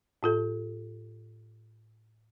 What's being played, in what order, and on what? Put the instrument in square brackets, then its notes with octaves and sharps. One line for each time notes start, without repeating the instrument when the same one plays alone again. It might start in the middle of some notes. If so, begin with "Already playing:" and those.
[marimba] A2 F4 A4